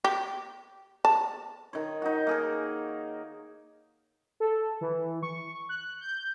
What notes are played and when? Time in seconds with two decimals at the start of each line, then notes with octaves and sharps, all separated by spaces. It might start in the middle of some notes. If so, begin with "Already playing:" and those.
0.04 G4
1.05 A5
1.73 D#3 C#5
2.02 D#4 F#4
2.27 A#3 G#4 A#4
4.40 A4
4.81 E3
5.23 C#6
5.69 F#6
6.01 G6